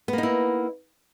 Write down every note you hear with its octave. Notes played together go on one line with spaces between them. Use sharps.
A#3 B3 D#4 E4